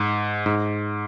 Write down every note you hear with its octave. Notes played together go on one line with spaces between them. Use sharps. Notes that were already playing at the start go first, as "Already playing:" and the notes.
Already playing: G#2
G#2